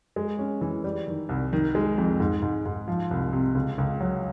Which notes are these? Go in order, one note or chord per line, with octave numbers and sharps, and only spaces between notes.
G#3
C#4
E3
G3
D#3
C2
D#3
G#3
F2
G#2
G#2
G#2
F3
C2
C3
C#2
C#2
F#3